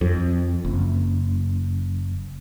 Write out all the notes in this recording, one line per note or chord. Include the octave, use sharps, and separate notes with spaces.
F2
F#1